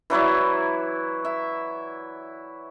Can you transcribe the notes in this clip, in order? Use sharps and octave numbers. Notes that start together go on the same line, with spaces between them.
E3 F#3 E4 D5
E5